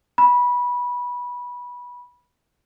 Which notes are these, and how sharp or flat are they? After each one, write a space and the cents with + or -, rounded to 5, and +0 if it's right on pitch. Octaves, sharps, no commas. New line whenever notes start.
B5 -15